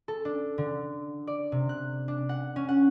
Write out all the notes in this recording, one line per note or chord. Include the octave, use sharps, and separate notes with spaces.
A4
D4
D3
D5
C3
F#6
D4
F#5
C#4
F#5